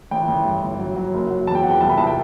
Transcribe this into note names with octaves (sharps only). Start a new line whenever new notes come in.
A1 G5
A1
G2
G1
F#3
F#3
F#1
F#3
E2 A5
G5
E2 F#5
G5
C2 A5
B5
C2 A5
G5